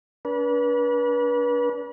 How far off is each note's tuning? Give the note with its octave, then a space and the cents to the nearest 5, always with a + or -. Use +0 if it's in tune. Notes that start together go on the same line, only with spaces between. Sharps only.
D4 -40 B4 -35